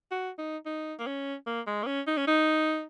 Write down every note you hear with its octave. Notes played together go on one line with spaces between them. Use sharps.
F#4
D#4
D#4
A#3
C#4
A#3
G#3
A#3
C#4
D#4
C#4
D#4